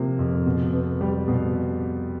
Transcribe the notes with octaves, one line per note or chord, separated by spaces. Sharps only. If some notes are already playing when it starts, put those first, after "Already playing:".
Already playing: C3 F3 A#3
F2
B2
B3
G3
B2